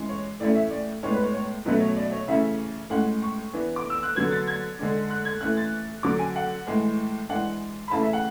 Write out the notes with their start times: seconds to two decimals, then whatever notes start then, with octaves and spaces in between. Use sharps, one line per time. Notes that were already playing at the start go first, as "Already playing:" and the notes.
Already playing: E3 G#3 C#4
0.09 C#5
0.40 A2 E3 A3 C#4 D5
0.55 E5
0.71 D5
1.03 A2 G#3 B3 D4 C#5
1.13 B4
1.23 C#5
1.34 C#5
1.65 B2 F#3 A3 C#4 B4
1.80 C#5
1.97 D5
2.12 C#5
2.28 C#3 E3 A3 C#4 E5
2.90 A2 G#3 C#4 F#5
3.22 C#6
3.53 E3 B3 D4
3.76 D6
3.90 E6
4.03 F#6
4.15 D3 F#3 B3 G#6
4.31 A6
4.48 G#6
4.79 D3 G#3 D4
5.10 F#6
5.25 G#6
5.41 E3 A3 C#4 F#6
5.57 A6
6.03 D3 F#3 C#4 D6
6.19 G#5
6.36 F#5
6.67 A2 E3 G#3
7.29 E3 G#3 D4 F#5
7.88 B5
7.91 C#3 E3 A3 C#4 A5
8.03 E5
8.13 F#5